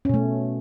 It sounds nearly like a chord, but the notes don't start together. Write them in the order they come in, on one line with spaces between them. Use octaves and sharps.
C#4 B2 A3